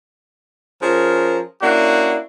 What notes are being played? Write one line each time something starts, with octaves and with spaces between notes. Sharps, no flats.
F3 C#4 G#4 A#4
A#3 C#4 D4 E4 F#4